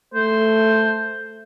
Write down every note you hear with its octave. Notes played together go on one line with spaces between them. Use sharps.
A3 C5